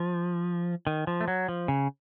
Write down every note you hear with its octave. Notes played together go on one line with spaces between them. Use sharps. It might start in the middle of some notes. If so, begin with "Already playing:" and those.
Already playing: F3
D#3
F3
A3
F#3
F3
C#3